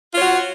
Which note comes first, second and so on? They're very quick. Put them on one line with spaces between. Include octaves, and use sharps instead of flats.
F4 C#5 F#4